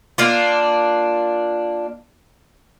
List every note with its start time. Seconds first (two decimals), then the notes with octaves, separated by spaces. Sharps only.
0.18 A#3 D4 F4